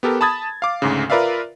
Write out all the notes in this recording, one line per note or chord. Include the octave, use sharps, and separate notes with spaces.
B3 G4 A4 A#4
A5 B5 D#6 G#6 A6
F5 D6
D2 G#2 C#3
F4 A#4 B4 D5 E5 F5